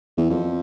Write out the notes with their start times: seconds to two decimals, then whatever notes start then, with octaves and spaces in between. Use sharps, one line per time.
0.17 E2
0.30 F2